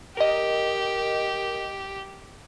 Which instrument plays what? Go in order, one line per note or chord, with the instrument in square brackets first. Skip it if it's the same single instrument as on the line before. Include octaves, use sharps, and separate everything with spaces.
[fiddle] G4 [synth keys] A#4 D#5